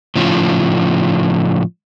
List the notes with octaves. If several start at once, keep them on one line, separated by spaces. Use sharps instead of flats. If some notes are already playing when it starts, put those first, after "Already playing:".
A2 C#3 F3